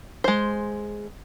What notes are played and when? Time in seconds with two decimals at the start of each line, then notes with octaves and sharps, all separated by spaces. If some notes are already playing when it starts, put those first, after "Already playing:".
0.24 G#3 C5